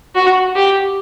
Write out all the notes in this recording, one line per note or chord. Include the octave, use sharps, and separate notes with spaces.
F#4
G4